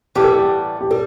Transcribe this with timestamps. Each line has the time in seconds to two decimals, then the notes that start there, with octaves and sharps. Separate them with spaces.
0.15 A2 E3 G3 B3 G4
0.24 A4
0.34 G4
0.81 G4
0.91 G3 A4